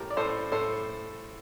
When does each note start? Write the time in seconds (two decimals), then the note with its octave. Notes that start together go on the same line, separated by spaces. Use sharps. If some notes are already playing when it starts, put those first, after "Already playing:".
Already playing: A2 G4 A#4
0.10 D5
0.17 A2 A4 C5
0.52 A2 A4 C5